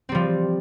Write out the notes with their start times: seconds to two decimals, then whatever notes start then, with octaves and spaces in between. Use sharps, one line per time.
0.09 C4
0.12 G3
0.15 F3